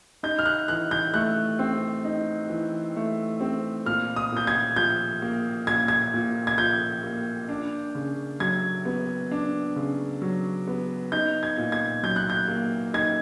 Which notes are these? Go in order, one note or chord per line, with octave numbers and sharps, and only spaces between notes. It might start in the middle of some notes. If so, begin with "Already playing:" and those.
D#4 G6
F6
F#6
E3 F#6
G6
A3 F#6
C4
D#4
E3
A3
C4
A#2 F6
D#6
A#2 G6
G#6
F3 G6
A#3
A#2 G#6
G#6
A#2
G#6
F3 G6
A#3
D4
C#3
F#3 G#6
B3
D4
C#3
F#3
B3
D#4 G6
G#6
A#2
G#6
F#3 G6
F#6
G6
A#3
D#4 G#6